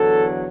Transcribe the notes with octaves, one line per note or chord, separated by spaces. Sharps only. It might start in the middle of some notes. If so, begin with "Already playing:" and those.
Already playing: E2 D3 F#3 A4